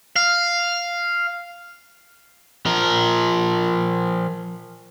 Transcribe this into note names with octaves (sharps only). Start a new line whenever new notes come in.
F5
F3 A#4